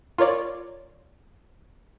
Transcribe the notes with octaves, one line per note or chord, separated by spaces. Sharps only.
F4 A#4 C#5 D5